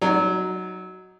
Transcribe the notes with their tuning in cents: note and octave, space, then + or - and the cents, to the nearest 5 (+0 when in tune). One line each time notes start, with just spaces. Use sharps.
F#3 +0 D#4 +0 D5 -40